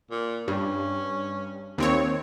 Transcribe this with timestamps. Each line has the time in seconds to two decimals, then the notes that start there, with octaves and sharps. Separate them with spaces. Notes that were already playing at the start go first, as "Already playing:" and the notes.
0.11 A#2
0.48 G2 C#4
1.78 D#2 C4 C#5